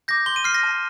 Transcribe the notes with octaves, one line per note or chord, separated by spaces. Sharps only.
D6 G6 A#6
C6 G7
D#7
F6 C7
A#6
A5